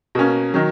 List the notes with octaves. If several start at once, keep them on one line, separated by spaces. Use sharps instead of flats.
B2 A#3 C#4
D#3 F#3